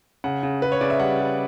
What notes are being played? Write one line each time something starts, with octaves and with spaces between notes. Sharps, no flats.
C#3 F#5
C#3
C#3 B4
C#5
C#3 D5
E5
G3 F#5
G3